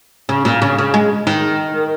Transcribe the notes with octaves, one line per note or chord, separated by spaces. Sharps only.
C#3
A#2
C#3
C#3
G#3
D#3